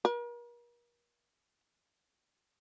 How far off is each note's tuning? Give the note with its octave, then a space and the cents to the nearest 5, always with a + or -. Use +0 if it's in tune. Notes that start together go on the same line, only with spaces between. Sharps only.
A#4 +40